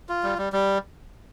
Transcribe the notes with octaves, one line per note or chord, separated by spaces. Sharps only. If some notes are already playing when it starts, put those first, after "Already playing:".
F4
G3
G3
G3